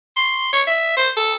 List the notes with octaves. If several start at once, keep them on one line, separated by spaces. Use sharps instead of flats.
C6
C#5
E5
C5
A4